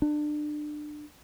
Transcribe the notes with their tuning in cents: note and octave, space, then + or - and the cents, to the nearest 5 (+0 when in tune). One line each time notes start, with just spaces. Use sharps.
D4 +25